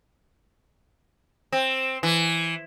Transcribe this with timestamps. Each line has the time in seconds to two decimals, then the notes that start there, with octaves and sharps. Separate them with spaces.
1.52 C4
2.03 E3